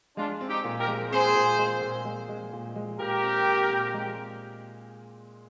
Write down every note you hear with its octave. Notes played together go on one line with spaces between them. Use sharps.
G#3 D4 F4
C4
D#4 G4
A#2
G4 A#4
G#3
C4 G#4 C5
A#2
G#3
A#2
G#3
G#3
A#2
G#3
A#2 G4 A#4
C4
C4
A#2
G#3